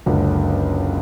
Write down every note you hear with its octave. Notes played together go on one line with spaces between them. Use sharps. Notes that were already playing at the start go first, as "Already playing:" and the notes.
F#1 C#2 D3